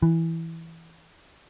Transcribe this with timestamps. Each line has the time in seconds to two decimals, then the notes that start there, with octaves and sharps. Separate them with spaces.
0.02 E3